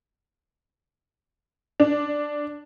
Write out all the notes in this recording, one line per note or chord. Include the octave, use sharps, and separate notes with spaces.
D4